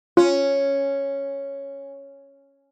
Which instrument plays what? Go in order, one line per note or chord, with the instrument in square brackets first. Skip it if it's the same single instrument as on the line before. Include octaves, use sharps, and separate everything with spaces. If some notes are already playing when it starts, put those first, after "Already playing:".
[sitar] C#4 [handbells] F4